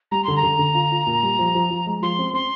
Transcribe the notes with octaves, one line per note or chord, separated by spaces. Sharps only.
G3 A#5
D3 C6
A#5
D3
D3
F4
F4
A#2
G3
F3
F3
F3
G#3
F3 C6
C4
C4 C6